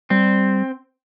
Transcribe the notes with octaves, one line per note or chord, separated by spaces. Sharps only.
G3 C4